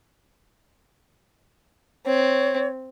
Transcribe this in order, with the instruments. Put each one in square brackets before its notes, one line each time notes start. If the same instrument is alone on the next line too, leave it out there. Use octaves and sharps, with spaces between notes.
[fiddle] C4 [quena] C#5